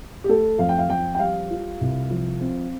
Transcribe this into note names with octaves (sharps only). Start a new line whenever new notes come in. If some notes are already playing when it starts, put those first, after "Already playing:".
G4
A3 A4
F2 F5
G5
F5
F2 G5
G5
G3 F5
F4
C2
F3
C4